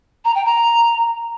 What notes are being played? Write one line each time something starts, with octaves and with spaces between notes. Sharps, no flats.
A#5
G5
A#5